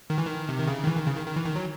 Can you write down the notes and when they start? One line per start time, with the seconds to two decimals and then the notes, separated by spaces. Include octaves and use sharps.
0.10 D#3
0.18 E3
0.26 D#3
0.49 C3
0.59 D#3
0.68 C#3
0.83 D#3
0.87 E3
0.97 D#3
1.07 C#3
1.16 D#3
1.27 D#3
1.36 E3
1.46 D#3
1.55 F#3